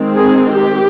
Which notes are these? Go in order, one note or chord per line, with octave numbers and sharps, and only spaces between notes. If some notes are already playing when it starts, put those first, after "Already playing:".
Already playing: D#3 G#3 C4
G#4
G4